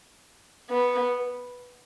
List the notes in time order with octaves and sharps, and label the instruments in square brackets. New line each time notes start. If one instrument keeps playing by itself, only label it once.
[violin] B3